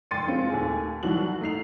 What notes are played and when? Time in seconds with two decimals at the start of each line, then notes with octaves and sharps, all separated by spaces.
0.11 F1 G5 C6 A6 C#7 D#7
0.27 G#3 C4 F4
0.50 D#2 A3 G#5
1.03 C2 D#3 E3 F#3 F#4 F#7
1.41 A3 D#4 C7 F7